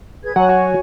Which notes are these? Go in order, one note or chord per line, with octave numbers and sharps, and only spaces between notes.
G#4 B4 G#6
F#3 C#5 F#5 G#5
F#4